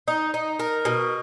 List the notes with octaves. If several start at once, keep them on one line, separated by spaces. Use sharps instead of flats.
D#4
D#4
A#4
B2